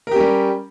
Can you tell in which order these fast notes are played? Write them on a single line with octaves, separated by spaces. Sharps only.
A#4 G4 C#4 G3